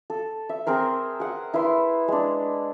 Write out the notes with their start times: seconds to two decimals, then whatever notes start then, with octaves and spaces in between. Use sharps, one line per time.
0.10 A4
0.49 E5
0.67 C4 G#4 A#4 C5
1.20 G#4 F#5
1.54 E4 B4 E5 C6
2.08 G#3 D4